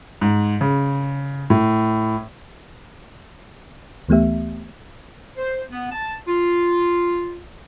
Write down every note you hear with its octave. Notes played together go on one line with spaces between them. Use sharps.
G#2
C#3
A2
D2 E3 A3 B3 G4 E5
C5
B3
A5
F4